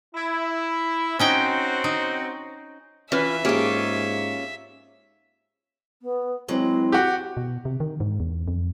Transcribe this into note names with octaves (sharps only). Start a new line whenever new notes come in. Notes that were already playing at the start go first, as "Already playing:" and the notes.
E4
C4 C#4 D#4 F#4 G5
D#4
E3 C#4 F4 B4 E5
G#2 A#3 C#4 F4 G4 G#4
B3
E3 F#3 G#3 C4
F#4 G4
B2
C3
D#3
G#2
E2
F2